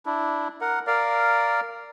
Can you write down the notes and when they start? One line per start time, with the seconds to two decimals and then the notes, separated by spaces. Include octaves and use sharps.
0.06 D4 E4
0.61 A#4 F#5
0.87 A#4 D5 F5